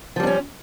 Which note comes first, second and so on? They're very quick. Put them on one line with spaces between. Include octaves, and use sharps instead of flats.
F3 G3 D4 C#4